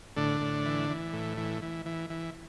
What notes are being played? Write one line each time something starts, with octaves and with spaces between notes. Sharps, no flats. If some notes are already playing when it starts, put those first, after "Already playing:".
A2 D3 D4
A2
E3
E3
A2
E3
E3
E3
E3